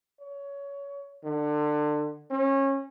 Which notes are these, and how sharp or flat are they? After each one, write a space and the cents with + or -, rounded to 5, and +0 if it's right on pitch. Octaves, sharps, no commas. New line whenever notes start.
C#5 +20
D3 +25
C#4 -25